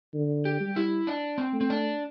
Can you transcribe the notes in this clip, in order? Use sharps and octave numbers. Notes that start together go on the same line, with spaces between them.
D3
G4
G3
E4
D4
C4
A3
C4
D4